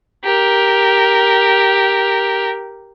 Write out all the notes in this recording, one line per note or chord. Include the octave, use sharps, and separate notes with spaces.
G4 A#4